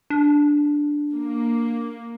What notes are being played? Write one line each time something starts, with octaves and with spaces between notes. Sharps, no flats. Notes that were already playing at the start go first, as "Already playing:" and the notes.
D4
A#3